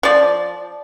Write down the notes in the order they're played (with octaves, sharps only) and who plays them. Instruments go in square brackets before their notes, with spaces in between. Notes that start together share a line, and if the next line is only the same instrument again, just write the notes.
[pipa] F3 D5